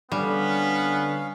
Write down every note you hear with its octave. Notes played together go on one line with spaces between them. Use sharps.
D3 G3 B3 C#4 F5